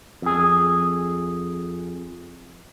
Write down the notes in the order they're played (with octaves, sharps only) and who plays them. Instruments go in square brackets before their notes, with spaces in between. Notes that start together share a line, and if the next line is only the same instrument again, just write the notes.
[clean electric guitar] F2 G#4